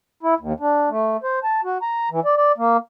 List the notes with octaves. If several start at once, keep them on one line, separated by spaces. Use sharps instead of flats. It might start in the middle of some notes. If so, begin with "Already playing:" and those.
E4
D#2
D4
A3
C5
A5
F#4
A#5
E3
D5
D5
A#3